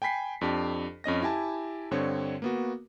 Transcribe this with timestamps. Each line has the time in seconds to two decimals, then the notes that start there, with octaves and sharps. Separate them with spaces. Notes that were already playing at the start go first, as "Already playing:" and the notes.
0.02 G5 G#5 B5 B6 C7
0.41 F2 D4 G4 A5
1.04 F2 C#4 D#5 A#6
1.22 E4 G4 G#5 A5
1.91 G2 D3 C4 C#5
2.42 A#3 B3 F#4